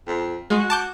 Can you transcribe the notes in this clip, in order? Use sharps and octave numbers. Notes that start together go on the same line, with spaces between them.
F2
G#3 F#4
A5 D6 G6